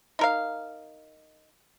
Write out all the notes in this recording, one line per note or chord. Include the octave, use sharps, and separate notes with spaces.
D#4 A#4 F5